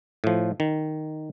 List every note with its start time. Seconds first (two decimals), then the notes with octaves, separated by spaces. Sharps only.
0.24 A2 F3
0.60 D#3